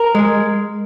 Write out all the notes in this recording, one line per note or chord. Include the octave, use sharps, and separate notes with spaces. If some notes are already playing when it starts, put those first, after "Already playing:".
Already playing: A#4
G#3